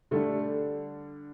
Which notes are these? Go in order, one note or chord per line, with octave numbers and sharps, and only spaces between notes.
D3 G3 A3 D4 A4